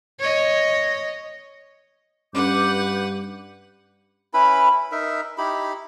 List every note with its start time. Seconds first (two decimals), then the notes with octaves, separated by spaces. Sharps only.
0.19 C#5 D#5
2.35 G2 C#4 B4 F#5 D6 G6
4.34 C#4 E4 B4 B5
4.92 D#4 A#4 E5
5.38 D#4 E4 G4 B5